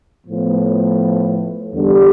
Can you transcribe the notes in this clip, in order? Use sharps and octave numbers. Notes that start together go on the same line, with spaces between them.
A2 F3 B3
E2 D3 G3